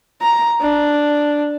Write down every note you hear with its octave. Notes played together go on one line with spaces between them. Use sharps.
A#5
D4